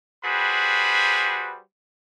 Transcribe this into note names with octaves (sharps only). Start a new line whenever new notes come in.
G3 F#4 G#4 B4 C5 B5